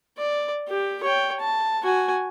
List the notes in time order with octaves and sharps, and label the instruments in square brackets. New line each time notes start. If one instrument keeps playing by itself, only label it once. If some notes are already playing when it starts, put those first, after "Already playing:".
[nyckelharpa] D5
G4
C#5 G5
A5
F#4 G#5